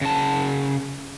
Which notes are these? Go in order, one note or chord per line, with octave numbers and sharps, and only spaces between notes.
C#3 A5